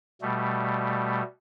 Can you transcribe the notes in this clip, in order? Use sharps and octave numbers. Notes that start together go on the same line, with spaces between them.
B2 G3 A3